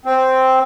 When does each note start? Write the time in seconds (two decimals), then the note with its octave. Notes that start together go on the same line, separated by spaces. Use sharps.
0.05 C4